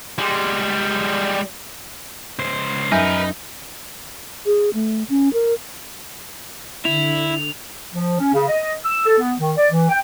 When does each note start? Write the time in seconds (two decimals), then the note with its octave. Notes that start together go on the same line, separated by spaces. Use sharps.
0.19 G3 G#3
2.39 C#2 C5
2.92 F#2 D#4 A#4 B4 E5 G#5 G6
4.46 G#4
4.74 A3
5.09 C#4
5.33 A#4
6.85 D3 E4 F7
7.91 F3
8.19 C#4
8.32 C#3
8.48 D#5
8.84 E6
9.05 A4
9.18 B3
9.38 D#3
9.58 D5
9.71 E3
9.89 G5